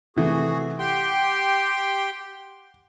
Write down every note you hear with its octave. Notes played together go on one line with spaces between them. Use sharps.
C3 E3 A3 F#4 G#4
G4 F#5 G5 C6